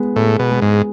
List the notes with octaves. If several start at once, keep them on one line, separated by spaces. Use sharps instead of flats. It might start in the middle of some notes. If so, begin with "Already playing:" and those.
Already playing: G#3 B3
A2 G#3
B2
G#3
G#2